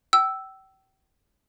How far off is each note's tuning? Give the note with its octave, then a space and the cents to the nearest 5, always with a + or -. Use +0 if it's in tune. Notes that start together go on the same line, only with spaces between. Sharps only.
G5 -35 E6 +0